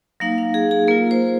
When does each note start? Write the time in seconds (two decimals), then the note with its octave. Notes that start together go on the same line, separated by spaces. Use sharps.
0.20 F#3 A#3 D#4 F5
0.38 F5
0.54 G#4
0.71 G#4
0.88 A#3 F4 A#4
1.11 C5